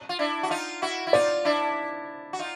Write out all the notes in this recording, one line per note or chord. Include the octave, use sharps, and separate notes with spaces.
F4
D4 E4
F#4
D#4 F4
E4 F#4
E4
D#4 F4 D5
D4 E4
F#4
D#4 F4